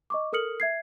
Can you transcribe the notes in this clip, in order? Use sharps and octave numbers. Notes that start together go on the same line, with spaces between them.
D#5 C#6 D6
A4 A#4 D#6 F6 C#7 F#7
E5 G#6 C7